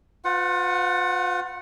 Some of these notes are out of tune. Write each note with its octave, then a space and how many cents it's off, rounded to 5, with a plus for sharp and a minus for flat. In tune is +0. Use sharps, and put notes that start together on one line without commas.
F4 +35 B4 +35 F#5 +0